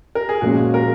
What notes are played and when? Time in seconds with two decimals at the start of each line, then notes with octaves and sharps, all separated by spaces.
0.15 A#4
0.29 G#4
0.41 A#2 F3 G#3 C#4 F4 F#4
0.74 A#4